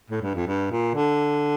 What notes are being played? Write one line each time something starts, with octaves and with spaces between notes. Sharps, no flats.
A2
G2
F2
G2
A#2
D3